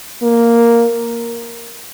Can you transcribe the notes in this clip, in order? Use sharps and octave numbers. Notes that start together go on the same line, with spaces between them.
A#3